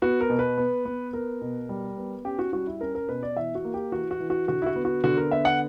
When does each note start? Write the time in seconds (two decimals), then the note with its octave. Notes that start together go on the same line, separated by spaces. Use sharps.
0.02 B3 F#4
0.21 A#4
0.30 B2
0.39 B4
0.58 B3
0.85 B3
1.13 B3 A#4
1.41 B2
1.69 G3
1.97 B3
2.25 C#4 G4
2.39 F#4
2.53 G3 F#4
2.67 E4
2.81 C#4 A#4
2.95 A#4
3.09 B2 B4
3.23 D5
3.37 E3 E5
3.55 F#4
3.64 A#3
3.74 G4
3.92 E3 F#4
4.11 F#4
4.20 E3
4.30 F#4
4.48 D3 F#4
4.62 E4
4.66 F#4
4.76 B3
4.85 F#4
5.04 D3 F#4
5.17 A#4
5.31 B3 E5
5.45 F#5